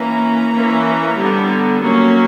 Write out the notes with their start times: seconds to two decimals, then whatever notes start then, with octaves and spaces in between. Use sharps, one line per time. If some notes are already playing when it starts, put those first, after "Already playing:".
Already playing: E3 A#3 C#4 A#5
0.52 E3 A#3 C#4
1.16 D3 G3 B3
1.80 F#3 A#3 C#4